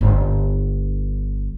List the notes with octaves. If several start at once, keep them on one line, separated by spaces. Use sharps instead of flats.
G1 D4